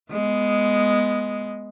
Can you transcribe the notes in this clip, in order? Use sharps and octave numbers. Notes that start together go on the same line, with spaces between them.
G#3 B3